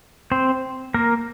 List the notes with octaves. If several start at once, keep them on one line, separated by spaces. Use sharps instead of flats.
C4 C5
A#3 A#4